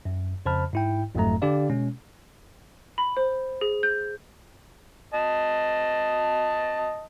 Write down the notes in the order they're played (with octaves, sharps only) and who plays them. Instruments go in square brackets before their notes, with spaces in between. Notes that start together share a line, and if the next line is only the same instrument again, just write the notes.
[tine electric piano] F#2
F2 C#3 C5 A5 B5 F6
G#2 E4 G5
G1 F2 G#2 F#3 A3 A#5
D3 D4 G4 D5 F5
B2 G#3 C#4
[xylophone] B5
C5
G#4
G6
[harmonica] D#5 A5